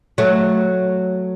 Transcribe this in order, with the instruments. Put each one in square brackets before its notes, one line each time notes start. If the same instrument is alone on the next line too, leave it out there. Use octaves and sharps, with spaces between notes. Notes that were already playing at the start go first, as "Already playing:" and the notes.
[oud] F#3 A3